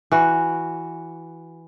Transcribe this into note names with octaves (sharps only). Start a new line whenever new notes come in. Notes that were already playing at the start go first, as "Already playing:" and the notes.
E3 F#4